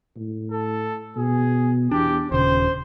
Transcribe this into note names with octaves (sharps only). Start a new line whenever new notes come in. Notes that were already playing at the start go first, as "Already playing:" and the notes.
A2
A4
B2 G#4
E2 D4 G4
D#1 C#3 C5